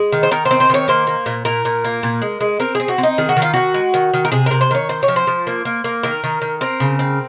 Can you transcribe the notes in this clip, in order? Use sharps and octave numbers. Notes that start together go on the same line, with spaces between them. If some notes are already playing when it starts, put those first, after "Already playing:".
Already playing: G#3
D#3
C5
D#3 A#4
C5
C4
C5
D#3 C#5
A#3 C5
A#3
A#2
A#2 A#4
A#2
A#3
A#2
G#3
G#3
C4 A#4
C4 G#4
F#4
C4
D#4
D#3 G#4
F#4
D#3
F4
D#3 F#4
G#3
D#3
D#3
A#4
C3 G#4
C3 A#4
C5
D#3 C#5
C4 C5
C#5
F3
C5
F3
A#3
A#3
A#3
D#3 A#4
D#3
D#3
C4 A#4
C#3
C4